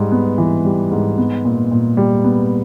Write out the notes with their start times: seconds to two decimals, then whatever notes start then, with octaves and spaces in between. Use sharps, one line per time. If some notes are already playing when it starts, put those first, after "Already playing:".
Already playing: G#2 G3
0.12 B3
0.38 E3
0.65 G3
0.91 G#2
1.18 B3
1.45 A#2
1.71 A#2
1.97 G3
2.24 B3